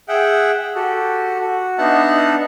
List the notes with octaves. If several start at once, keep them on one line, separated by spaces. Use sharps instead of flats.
G#4 E5 F#5 G5
F#4 G4 A4
F#4
B3 D4 D#4 E5 F#5 A5